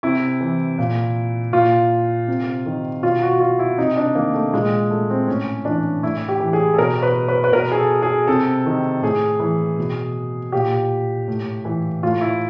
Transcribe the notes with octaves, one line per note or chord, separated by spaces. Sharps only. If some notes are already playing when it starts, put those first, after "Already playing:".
C3 E4
E3
A#2
A#2 F4
C3
D#3
B2 F4
F#4
F4
E4
C3 D#4
D4
D#3 A#3
A3
A#2 G#3
A3
C4
A2 C#4
E3 D4
A2 E4
G4
E3
G#4
A4
B2 A#4
B4
B4
B4
B2 A#4
G#4
A4
G#4
C3 A4
D#3
A2 G#4
E3
B2
A#2 G4
A2
E3
A2 F4
E4